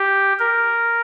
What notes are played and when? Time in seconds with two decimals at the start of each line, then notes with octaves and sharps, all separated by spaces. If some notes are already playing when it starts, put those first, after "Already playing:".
Already playing: G4
0.39 A#4